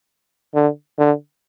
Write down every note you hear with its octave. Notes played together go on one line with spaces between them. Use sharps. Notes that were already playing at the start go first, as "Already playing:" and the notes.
D3
D3